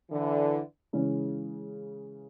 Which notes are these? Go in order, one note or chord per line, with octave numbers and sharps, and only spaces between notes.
D3 E3
C#3 E3 G#3 C#4